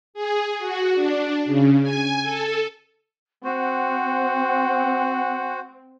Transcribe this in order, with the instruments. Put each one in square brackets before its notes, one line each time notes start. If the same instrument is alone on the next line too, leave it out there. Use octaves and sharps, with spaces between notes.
[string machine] G#4
F#4
D4
C#3
G#5
A4
[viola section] C4 [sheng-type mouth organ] F#4 C5 [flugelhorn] F#5 [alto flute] G5